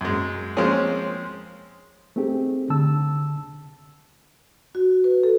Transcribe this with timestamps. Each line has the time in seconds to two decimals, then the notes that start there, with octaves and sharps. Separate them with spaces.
0.01 F#2 G#3
0.57 F3 G#3 A#3 C4 C#4 G#4
2.16 A3 C4 D#4 G4 G#4
2.70 D3 A5 E6
4.75 F#4
5.04 B4
5.23 A4